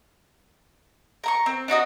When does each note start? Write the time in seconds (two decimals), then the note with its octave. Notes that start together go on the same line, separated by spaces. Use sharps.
1.24 A#4 A#5 C#6
1.46 C4
1.68 D4 D#4 F#4 D#5